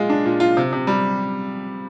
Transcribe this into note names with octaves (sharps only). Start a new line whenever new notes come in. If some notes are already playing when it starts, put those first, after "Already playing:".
Already playing: A#2 G#3 F4
D4
A#2
F4
C3
C3
G3